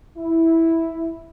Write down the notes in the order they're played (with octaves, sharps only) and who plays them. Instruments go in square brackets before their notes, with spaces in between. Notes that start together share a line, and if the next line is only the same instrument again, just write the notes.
[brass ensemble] E4